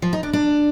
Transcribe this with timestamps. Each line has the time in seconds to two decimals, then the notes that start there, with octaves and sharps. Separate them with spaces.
0.02 F3
0.13 D#4
0.23 D4
0.33 D4